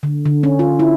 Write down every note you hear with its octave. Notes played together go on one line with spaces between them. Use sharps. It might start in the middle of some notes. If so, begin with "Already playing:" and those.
D3
D3
C#4
F4
E4